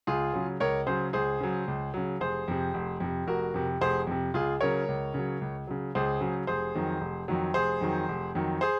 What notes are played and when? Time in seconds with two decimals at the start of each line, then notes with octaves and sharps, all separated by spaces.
0.07 C#2 F4 G#4
0.33 C#3 F#3
0.60 C#2 A#4 C#5
0.86 C#3 F#3 G#4 C5
1.13 C#2 G#4 C5
1.40 C#3 F#3
1.68 C#2
1.94 C#3 F#3
2.20 F1 G#4 C5
2.48 F2 C3
2.74 F1
3.00 F2 C3
3.27 F1 F#4 A#4
3.54 F2 C3
3.81 F1 G#4 C5
4.07 F2 C3
4.34 C#2 F4 G#4
4.60 C#3 F#3 A#4 C#5
4.88 C#2
5.14 C#3 F#3
5.41 C#2
5.67 C#3 F#3
5.95 C#2 G#4 C5
6.21 C#3 F#3
6.47 F1 G#4 C5
6.75 F2 D#3 F#3
7.01 F1
7.28 F2 D#3 F#3
7.54 F1 G#4 C5
7.81 F2 D#3 F#3
8.08 F1
8.35 F2 D#3 F#3
8.61 G#4 C5